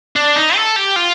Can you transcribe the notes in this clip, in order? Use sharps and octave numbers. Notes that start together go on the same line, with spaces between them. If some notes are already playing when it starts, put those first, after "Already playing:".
D4
D#4
A4
G4
F4